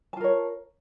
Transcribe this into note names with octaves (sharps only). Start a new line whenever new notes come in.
F4 A#4 C#5 A5